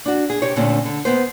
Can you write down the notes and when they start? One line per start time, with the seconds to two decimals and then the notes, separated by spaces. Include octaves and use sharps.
0.06 D4 F#4
0.30 G#4
0.42 C3 G4 C#5
0.56 A#2 D3 A3 C4 C#4
0.85 D3
1.05 D#2 G#2 B3 C5